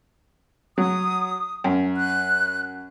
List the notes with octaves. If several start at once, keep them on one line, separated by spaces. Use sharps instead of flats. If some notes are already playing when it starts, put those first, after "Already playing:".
F#3 D#6
F#2
F#6